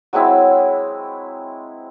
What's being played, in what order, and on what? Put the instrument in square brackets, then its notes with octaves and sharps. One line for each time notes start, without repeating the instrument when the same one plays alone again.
[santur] F#3 G#3 C4 E4